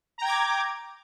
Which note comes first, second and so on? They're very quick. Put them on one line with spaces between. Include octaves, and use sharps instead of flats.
A#5 G5 G#6 D6